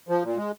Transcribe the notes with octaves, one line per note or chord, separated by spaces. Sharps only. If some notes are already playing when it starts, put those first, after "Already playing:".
F3
A#2
G#3